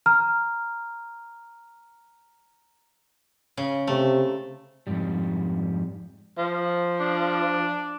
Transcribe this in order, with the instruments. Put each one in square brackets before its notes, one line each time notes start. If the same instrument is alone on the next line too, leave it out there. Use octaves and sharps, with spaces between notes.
[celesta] A#5 F6
[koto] C#3
[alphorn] C3 [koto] A3
[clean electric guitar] F2 G#2 G3
[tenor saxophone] F3
[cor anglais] D4